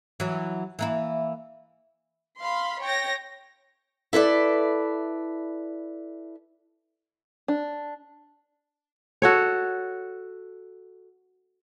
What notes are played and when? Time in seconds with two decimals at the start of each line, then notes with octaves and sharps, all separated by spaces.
0.20 E3 F#3
0.79 E3 A#3 E4
2.40 F5 B5 C6
2.82 C#5 G5 A#6
4.13 E4 A4 B4 D5
7.48 D4
9.22 F#4 A4 C#5